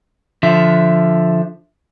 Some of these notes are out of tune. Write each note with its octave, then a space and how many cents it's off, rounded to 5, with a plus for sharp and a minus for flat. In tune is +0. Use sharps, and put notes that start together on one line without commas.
D3 +0 F3 +0 E5 +5